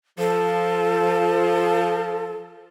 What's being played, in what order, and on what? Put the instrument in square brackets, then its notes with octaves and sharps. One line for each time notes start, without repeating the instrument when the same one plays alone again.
[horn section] F3 [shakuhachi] A4